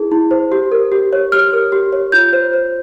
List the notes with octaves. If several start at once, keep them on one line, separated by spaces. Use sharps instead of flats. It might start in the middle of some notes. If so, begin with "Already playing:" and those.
Already playing: E4 G#4
E4
C5
G4
A#4
G4
C#5
G4 F6
A#4
G4
C#5
F4 G6
C5
C5